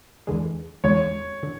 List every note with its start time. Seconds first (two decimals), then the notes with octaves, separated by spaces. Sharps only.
0.27 E2 D3 G#3
0.84 E2 D3 G#3 C#5
1.43 D3